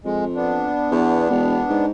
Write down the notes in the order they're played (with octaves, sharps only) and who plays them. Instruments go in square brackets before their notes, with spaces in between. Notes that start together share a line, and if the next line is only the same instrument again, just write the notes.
[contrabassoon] F2 [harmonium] G#3
[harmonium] B3 D4
[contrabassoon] E2
E1
G#2